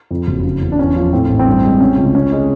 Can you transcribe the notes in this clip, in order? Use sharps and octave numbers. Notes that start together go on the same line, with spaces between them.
F2
F#1
C#3
E2
D4
E2 C#4
F3
A2 C4
A1
C4
G2
G#3
C3 C#4
C#2
C3 C#4
G#3